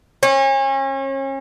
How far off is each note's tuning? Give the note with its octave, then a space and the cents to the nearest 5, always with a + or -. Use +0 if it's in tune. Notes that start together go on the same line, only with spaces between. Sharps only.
C#4 -35